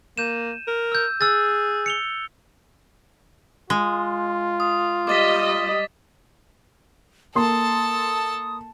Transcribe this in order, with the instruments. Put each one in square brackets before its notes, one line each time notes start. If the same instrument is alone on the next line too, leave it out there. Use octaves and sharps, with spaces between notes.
[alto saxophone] A#3 [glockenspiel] G6 D#7 E7
[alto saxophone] A#4
[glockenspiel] E6 G6
[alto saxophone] G#4 [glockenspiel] E6 F#6 A6
[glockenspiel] C#7 F7 G7
[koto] G#3 [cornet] F4
[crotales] D#6
[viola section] G3 D#5 [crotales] D6 A6 B6
[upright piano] A#3 C6 [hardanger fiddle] A4 A5 [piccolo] D#6